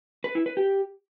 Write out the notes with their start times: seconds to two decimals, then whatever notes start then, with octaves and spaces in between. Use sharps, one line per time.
0.24 B4
0.35 E4
0.46 B4
0.57 G4